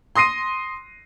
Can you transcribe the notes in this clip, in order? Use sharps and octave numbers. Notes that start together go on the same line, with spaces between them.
C6 D#6 A#6 C7 D#7